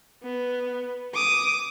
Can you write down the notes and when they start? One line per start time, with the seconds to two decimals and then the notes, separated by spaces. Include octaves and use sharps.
0.23 B3
1.14 D6 D#6